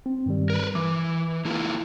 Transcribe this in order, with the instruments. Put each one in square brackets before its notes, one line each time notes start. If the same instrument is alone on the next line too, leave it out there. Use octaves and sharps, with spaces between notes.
[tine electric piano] C4
G2 D#3 G3
[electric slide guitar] A#4 B4
[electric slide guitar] E3 [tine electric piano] D6
[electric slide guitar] A#3 E4 F4